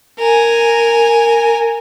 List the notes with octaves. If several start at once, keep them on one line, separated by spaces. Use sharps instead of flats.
A#4 G#5